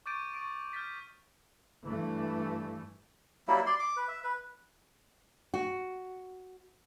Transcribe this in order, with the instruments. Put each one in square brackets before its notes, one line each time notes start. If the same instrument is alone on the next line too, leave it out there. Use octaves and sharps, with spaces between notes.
[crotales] C#6 D6 G6 A6 D7 D#7
C#6 D#6 D7
F6 G6 A6 B6
[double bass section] G2 E3 A3
[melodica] F#3 G3 A#3 E4
D5 C6
D6
B4
E5
B4
[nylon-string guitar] F#4